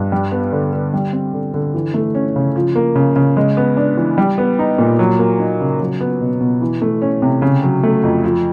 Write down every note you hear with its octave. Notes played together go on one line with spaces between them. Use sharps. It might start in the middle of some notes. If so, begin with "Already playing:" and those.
Already playing: G2
G3
B3
D3
D3
G3
C4
D3
D3
E3
A3
C#4
C#3
F3
A#3
C#3
C#3
G#3
B3
D4
E3
G3
B3
D#4
A#2
F#3
A#3
D#4
C#3
F#3
B3
B2
B2
E3
A3
C#4
C3
C#3
F#3
A3
F2
F3